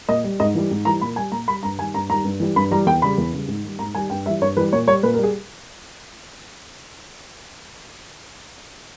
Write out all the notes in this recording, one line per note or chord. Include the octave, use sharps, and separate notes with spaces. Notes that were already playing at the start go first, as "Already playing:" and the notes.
A#2 D#5
G3
G#2 D#5
E3 G3
G#2
E3 G3 A#5
A#2 B5
G3 G#5
A#2 A#5
G3 B5
G2 A#5
D#3 G3 G#5
G2 A#5
D#3 G3 A#5
G2
E3 G3
G2 B5
E3 G3 A#5
E2 G5
C#3 G3 B5
E2
C#3 G3
G#2
D#3 G3
G#2 A#5
D#3 G3 G#5
G2 G5
E3 G3 E5
G2 C#5
E3 G3 B4
A#2 C#5
G3 C#5
A#2 B4
A#4
G3
G#4